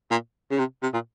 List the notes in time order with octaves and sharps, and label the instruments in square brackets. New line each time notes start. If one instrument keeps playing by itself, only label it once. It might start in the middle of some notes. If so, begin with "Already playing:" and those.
[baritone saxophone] A#2
C#3
C3
C3
A#2